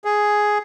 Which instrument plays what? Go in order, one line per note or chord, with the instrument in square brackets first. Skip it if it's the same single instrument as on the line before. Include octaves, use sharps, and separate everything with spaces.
[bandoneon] G#4